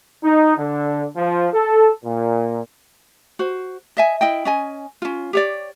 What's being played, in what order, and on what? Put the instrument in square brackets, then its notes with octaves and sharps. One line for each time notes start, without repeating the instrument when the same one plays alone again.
[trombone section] D#4
D3
F3
A4
A#2
[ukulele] F#4 C5
D#5 E5 G#5
E4 D#5 G5
C#4 D#5 G#5
C#4 F4
G4 C#5 D5